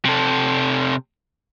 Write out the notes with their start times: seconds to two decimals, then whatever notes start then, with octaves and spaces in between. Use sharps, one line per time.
0.05 C3 A4